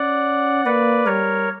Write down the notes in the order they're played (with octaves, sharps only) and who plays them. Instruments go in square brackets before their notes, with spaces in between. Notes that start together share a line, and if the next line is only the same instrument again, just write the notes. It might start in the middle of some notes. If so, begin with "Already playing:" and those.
Already playing: [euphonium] C#4 [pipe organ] D5 F#5
[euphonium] A#3 [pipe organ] B4 D5
[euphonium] G3 [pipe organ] A#4 C#5